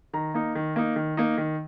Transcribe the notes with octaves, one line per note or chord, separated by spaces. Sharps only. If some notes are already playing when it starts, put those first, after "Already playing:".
D#3 A#5
A#3 D#4
D#3
A#3 D#4
D#3
A#3 D#4
D#3